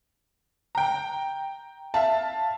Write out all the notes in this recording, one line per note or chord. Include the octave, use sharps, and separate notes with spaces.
G5 A#5
E5 F5 A5